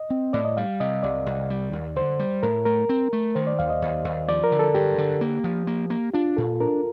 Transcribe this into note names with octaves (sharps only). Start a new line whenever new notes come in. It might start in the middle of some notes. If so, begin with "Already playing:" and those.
Already playing: D#5
C4
A2 D5
D#5
G3 F5
C3 D#5
C2 D5
C2
G3
D#2
D3 C5
G3
A2 A#4
A3 A#4
C4
A3
D#3 C5
D5
D#2 F5
D#5
D#2
D#2
F3 D5
A#4
D3
A4
G2 G4
D3
A#3
F3
A#3
A#3
D4 F4
A#2 A4
D4 A#4